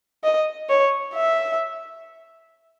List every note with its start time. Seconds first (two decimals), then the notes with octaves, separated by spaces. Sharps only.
0.24 D#5
0.69 C#5
1.15 E5